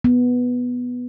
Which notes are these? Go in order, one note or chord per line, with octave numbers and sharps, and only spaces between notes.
B3